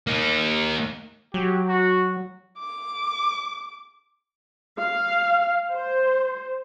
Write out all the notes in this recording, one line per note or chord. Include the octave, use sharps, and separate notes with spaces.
A#3 D#4
F#3 G4
F#4
D6
F5
C5